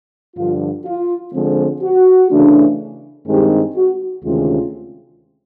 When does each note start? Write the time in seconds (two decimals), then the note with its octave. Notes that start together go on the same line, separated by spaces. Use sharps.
0.36 G2 D3 F3 F4
0.85 F4
1.33 D3 F3 G#3 C4
1.82 F#4
2.30 C#3 E3 A3 D4
3.27 G2 D#3 G#3 C4 D#4 G4
3.76 F#4
4.24 D2 C3 D#3 G#3 C#4 F4